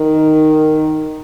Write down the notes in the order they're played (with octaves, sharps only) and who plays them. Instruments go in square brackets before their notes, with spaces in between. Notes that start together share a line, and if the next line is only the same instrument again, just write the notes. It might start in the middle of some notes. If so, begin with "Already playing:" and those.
Already playing: [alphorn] D#3